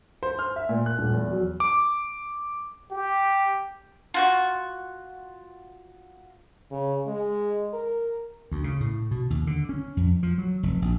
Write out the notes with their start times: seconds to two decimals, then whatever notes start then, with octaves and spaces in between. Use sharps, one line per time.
0.23 C5
0.39 F6
0.56 E5
0.69 A#2
0.86 F#6
0.99 D#1
1.13 E2
1.32 F#3
1.60 D6
2.91 G4
4.14 F4 F#4 C#6
6.71 C#3
7.07 G#3
7.73 A#4
8.52 D2
8.64 C#3
8.80 A2
9.11 B2
9.30 D#2
9.47 D3
9.69 C#4
9.97 F2
10.23 F3
10.38 F#3
10.63 F1
10.82 A#1